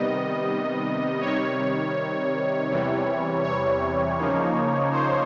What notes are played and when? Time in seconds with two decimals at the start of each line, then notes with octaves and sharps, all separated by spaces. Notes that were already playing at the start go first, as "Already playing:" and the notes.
Already playing: C3 D#3 G3 B3 D#5
1.21 C3 D#3 G3 C#5
2.69 E2 C3 E3 G3
3.43 C#5
4.18 C#3 F3 A#3 D#4
4.92 C5